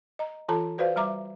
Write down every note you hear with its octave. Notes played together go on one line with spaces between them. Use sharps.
D#5 A#5
E3 F4 A4 A5 A#5
F#4 B4 C5 D5 F5
G3 E5 A#5 D6